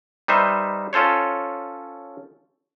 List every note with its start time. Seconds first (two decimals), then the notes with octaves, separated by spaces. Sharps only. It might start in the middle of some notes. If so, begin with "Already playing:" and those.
0.28 G3 D#4 B4 C5 E5
0.93 C#4 F4 A4 C5 C#5